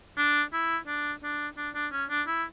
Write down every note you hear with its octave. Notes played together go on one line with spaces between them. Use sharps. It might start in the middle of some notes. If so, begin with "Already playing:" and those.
D4
E4
D4
D4
D4
D4
C#4
D4
E4